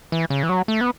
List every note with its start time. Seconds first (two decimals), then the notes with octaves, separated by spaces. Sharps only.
0.12 E3
0.30 C#3
0.43 E3
0.49 F#3
0.68 A3
0.81 B3